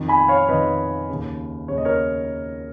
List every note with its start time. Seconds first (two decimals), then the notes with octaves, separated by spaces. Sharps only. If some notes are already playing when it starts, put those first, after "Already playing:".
Already playing: F2 D#3
0.08 G#5 B5
0.28 C#5 F5
0.48 F2 D#3 B4 D#5
1.09 D#2 C#3
1.68 D#2 C#3 C#5
1.78 D#5
1.85 A#4 C#5